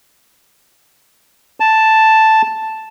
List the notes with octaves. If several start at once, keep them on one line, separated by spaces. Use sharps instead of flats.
A5